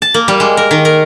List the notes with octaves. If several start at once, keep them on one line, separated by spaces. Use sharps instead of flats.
A5
A#3
G3
G#3
A#4
D#3
A#4